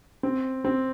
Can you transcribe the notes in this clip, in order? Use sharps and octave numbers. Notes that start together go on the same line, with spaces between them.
C4
C4